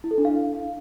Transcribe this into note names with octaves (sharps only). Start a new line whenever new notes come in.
E4
A4
D4
F5